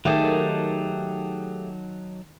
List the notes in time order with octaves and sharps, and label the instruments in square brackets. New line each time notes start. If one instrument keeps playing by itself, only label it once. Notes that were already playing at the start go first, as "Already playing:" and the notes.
[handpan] D#3 [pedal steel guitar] F#3 D#4 A5 [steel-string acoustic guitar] A3 G4 G#4